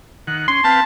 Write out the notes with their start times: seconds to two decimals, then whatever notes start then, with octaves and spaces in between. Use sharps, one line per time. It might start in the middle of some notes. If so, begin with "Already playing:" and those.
0.27 D#3 F#5
0.48 C#4 C6
0.64 C4 B4 F5 A5